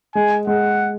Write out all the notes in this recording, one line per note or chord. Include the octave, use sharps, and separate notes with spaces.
G#3 G#5
G#3 F#5